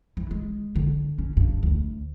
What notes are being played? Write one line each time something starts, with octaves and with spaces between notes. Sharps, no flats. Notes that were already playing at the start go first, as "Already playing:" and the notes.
E3
G#3
D3
C#4
G2
D2